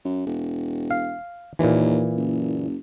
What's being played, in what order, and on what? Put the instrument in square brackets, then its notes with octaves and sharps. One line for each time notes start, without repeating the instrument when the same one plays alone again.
[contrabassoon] F#2
E1
[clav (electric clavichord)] F5
[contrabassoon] D#2 [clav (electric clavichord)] A#2 E3
[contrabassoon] F#1